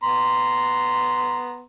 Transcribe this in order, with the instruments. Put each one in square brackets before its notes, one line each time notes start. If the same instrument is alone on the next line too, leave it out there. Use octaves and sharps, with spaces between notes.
[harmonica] B3 A#5 C6